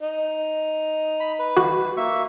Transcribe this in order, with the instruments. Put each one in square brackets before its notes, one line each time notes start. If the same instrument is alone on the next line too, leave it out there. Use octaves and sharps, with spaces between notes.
[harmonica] D#4
[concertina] B5
B4
[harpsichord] F#4
[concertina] A#3 E5 C#6